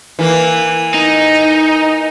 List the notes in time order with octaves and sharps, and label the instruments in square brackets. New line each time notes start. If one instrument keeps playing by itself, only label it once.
[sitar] E3 A#3
[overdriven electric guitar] D#4